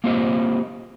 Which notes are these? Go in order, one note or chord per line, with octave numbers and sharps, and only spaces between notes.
A#3 C4 F4 G4 C5 D#5